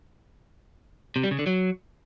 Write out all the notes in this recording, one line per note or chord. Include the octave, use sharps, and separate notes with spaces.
C3
G3
C#3
D3
F#3